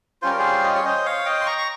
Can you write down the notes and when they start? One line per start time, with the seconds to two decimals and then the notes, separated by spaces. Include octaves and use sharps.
0.22 G3 C#4 F4 C5
0.31 A#4
0.39 G#4 C5
0.64 D#5
0.75 C#5
0.85 C5 D#5
1.06 C#5 F5
1.26 D#5 G5
1.41 C6
1.46 A#5 C#6
1.58 C#6